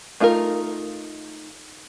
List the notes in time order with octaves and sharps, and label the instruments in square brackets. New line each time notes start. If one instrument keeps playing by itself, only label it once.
[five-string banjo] A3 D#4 F4 A4 A#4